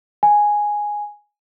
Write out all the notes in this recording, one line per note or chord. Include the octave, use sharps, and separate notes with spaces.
G#5